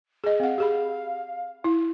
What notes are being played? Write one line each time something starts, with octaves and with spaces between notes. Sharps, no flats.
G#4 D#5
C4 F5 F#5
G4 G#4 B5
E4